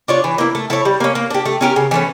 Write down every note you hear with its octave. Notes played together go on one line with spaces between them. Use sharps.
D4 F4 C#5
E3
A#3 E4
A3
E4 A4 C#5
G3
A#3 C#4
A#3
D4 G4
A3
C#4 G4 A#4
C#3
E3 A3 C#4